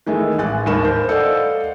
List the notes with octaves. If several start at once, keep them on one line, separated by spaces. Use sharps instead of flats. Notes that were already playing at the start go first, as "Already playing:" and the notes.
D#3 E3 G#3 A3
A1 G#5 F#6 A6
D#2 G#2 A#4 B5 C#6 E7
A#4 C5
A4 C5 D5 D#5 F5 F#5